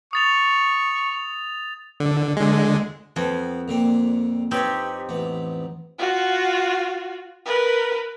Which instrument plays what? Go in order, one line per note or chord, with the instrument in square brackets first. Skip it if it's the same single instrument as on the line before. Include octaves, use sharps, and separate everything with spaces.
[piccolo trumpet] C#6 [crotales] D#6 A6 F7
[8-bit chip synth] D3
D3 G#3
[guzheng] F2 [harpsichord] B3 C4
[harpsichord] A#2 D3 C4
[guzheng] C4 D#4 G4 [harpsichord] B4 C#5 G#5
[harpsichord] A1 B3
[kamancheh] F4 F#4
A#4 B4